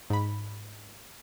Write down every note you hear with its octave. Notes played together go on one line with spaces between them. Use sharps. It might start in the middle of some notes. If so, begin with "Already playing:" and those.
G#2 B5